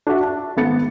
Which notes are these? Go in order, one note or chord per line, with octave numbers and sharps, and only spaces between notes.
D4 F#4 E5
A5
G#1 A3 B3 A6 C#7